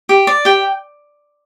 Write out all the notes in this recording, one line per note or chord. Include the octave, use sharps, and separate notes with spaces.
G4
D5
G4 G5